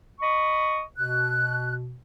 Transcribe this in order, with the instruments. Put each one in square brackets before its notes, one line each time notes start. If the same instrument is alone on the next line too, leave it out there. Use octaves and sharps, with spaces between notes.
[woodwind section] D#5 B5 C#6
[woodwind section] B2 [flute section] F#6